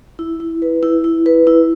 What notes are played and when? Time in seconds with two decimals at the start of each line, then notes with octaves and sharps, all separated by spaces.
0.19 E4
0.40 E4
0.62 B4
0.83 E4
1.04 E4
1.26 B4
1.47 E4